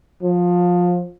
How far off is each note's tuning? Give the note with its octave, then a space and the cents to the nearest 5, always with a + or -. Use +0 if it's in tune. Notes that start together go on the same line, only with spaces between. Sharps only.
F3 +20